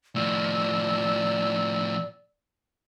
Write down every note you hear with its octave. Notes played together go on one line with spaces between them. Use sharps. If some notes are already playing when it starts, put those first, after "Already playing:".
A2 F3 D5 E6